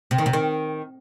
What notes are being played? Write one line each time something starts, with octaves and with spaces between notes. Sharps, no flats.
C3
D#3
C3
D#3